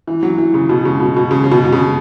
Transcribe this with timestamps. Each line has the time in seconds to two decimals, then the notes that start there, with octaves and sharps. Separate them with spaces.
0.07 E3
0.23 F#3
0.38 E3
0.54 C#3
0.69 B2
0.85 C#3
1.00 B2
1.16 B2
1.31 C#3
1.44 C#3
1.51 B2
1.65 B2
1.72 C#3